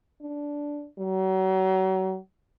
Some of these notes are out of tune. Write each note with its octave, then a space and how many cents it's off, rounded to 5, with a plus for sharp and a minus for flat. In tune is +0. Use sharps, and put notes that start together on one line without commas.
D4 -10
F#3 +35